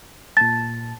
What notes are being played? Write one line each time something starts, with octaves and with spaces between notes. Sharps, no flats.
A#2 A5 A6